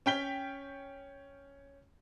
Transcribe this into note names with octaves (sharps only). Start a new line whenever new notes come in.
C#4 G5 B6 G7